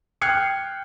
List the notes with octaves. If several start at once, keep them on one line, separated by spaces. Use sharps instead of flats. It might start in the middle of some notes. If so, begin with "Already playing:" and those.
G5 F6 F#6 G#6 C7 C#7